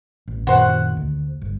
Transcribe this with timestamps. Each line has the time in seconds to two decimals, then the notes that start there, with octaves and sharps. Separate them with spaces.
0.28 A1
0.47 F#2 A#2 D#3 F#4 C5 F#5
0.97 D2
1.42 G1